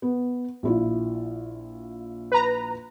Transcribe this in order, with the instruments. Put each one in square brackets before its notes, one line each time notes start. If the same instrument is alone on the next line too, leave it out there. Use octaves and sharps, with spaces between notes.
[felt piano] B3
A#1 E4 F4
[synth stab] B4 A#5